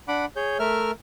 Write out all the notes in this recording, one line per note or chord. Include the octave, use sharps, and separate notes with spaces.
D4 F#5 B5 D6
G#4 C#5 G6
A3 A#4 E5 F6